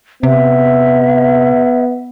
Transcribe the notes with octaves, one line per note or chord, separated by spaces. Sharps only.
C3 B3 E5